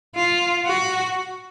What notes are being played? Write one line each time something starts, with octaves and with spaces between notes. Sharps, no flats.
F4
F#4